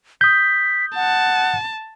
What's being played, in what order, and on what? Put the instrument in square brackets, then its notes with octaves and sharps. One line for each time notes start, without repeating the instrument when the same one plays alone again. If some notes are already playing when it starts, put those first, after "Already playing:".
[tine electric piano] D#6 G6 [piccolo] B6
[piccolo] F#5 [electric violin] A5